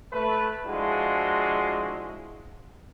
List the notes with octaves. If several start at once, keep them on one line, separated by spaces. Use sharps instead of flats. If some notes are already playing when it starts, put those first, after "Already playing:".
A3 B4
F3 G#3 D4 E4 F#4